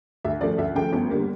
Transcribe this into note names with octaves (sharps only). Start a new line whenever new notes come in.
D2 E5
C#3 F3 A3 D5
D2 E5
C#3 F3 A3 G5
G1
D3 G3 A#3